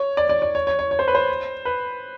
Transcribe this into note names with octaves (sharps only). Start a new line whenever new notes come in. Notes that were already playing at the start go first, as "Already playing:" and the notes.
Already playing: C#5
D5
D5
D5
C#5
C#5
C#5
C#5
C5
B4
C5
B4